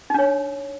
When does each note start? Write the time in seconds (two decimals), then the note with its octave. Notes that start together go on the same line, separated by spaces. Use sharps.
0.10 D#4
0.14 D4
0.19 C#5